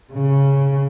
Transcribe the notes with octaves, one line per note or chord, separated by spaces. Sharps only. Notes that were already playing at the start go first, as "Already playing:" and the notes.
C#3